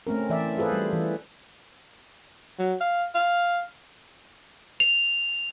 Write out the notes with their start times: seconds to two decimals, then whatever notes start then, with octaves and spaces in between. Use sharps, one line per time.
0.07 A3 C4 C#4 A#4
0.30 E3 D5 E5
0.57 F4 G#4 A4 B4 C5
0.72 G3
0.93 E3
2.59 F#3
2.81 F5
3.15 F5
4.80 F7